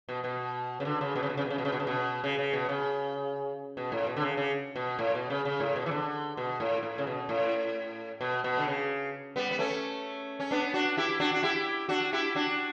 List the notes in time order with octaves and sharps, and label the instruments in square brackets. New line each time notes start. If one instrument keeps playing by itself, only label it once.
[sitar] B2
B2
C#3
D3
C#3
B2
C#3
B2
C#3
B2
C#3
B2
C#3
B2
C#3
B2
C#3
C#3
B2
C#3
B2
A2
B2
D3
C#3
C#3
B2
A2
B2
C#3
C#3
A2
B2
E3
D3
B2
A2
A2
C#3
B2
A2
B2
B2
D3
C#3
G3 B3
B3
A3 C#4
C#4
B3 D4
D4 F#4
E4 G4
D4 F#4
F#4
E4 G4
D4 F#4
E4 G4
D4 F#4